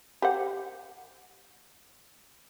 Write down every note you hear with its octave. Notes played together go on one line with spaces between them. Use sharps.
G4 C5 F#5